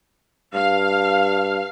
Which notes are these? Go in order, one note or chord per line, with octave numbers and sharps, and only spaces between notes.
G2 F5